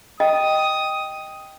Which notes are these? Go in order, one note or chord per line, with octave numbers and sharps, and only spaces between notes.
D#5 G5 D#6